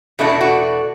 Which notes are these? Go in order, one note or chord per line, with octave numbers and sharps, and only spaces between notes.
E2 B2 A3 D4 E4
F#4